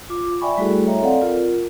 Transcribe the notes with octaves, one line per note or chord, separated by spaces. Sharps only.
F4 D6
D5 E5 G5 G#5 B5 C#6
G3 A3 E4 F#4 G#4 A4
C#5 D#5 E5 G5 A#5
C4 A4 D5 F5 F#5
F4 A#4